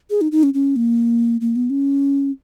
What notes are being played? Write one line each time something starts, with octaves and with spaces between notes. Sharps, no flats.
G#4
D#4
D#4
C#4
C#4
A#3
A#3
B3
C#4